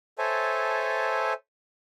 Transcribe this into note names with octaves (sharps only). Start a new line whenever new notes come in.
A4 C5 C#5 E5 G#5 A5